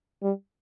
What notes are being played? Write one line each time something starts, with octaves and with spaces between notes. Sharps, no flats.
G3